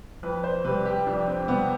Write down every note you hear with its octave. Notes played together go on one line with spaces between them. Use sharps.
F2 B4
C5
C3 G3 B4
G4
F2 D4
C4
C3 G3 B3